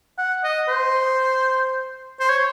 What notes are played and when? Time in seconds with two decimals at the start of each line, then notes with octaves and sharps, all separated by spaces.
0.18 F#5
0.44 D#5
0.68 C5
2.20 C5
2.29 C#5